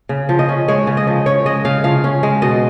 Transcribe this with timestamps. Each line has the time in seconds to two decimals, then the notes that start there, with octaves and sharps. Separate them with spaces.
0.09 C#3
0.29 F3
0.39 D#5
0.49 C#4
0.68 G#3 C#5
0.87 C#3
0.97 D#5
1.07 F3
1.26 C#4 C#5
1.46 G#3 D#5
1.65 C#3 F5
1.84 F3 F5
2.04 C#4
2.23 G#3
2.42 B2 D#5